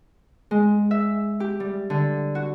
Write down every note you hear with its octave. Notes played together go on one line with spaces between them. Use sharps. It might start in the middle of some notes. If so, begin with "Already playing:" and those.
G#3
E5
G4
G3
D3
F#4